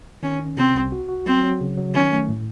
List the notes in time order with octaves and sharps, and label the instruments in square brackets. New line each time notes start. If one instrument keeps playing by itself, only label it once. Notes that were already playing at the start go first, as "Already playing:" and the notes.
[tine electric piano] D#3 [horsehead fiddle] C#4
[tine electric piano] C#4
[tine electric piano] C3 [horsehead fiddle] C4
[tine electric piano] C2
F#4
F#4
[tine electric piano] F#3 [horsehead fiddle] C4
[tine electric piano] F#3
C#3
F#3
[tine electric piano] D#3 [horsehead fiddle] C#4
[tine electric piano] A3
A2